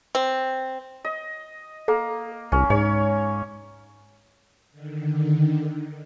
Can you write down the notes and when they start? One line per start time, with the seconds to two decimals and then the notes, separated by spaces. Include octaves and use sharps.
0.15 C4
1.04 D#5
1.88 A#3 A4
2.52 C2 C#4
2.70 G#2 C#5
4.72 D3 D#3